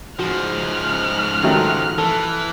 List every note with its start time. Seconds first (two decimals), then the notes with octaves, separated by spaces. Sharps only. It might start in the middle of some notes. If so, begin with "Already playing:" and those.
0.19 G#2 F3 F#4 F6 F#6
1.43 D#3 F#3 A3
1.98 E3 A4